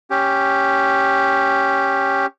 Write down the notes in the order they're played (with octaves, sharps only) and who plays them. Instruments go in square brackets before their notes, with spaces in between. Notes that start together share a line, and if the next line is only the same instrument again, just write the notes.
[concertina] C#4 G4